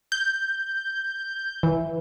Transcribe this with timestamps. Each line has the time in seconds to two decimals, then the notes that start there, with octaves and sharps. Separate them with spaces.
0.12 G6
1.63 E3